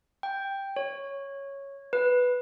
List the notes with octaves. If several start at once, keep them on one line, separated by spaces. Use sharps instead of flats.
G5
C#5
B4